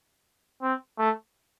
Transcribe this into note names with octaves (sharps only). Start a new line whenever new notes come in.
C4
A3